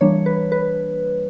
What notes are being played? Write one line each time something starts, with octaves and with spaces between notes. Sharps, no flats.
E3 G3 A#3 D4 C#5
B4
B4